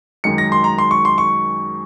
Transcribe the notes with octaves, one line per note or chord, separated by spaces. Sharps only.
F#2 D#3 G#3 C#7
A#6
C6
A#5
C6
C#6
C6
C#6